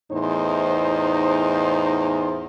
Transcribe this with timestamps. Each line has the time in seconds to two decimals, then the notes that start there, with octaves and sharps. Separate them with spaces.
0.12 E2 A2 D#4 C5